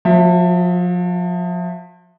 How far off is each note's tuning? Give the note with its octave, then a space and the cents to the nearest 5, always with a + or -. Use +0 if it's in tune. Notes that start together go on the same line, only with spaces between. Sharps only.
F3 +30 F#4 -10 E5 +5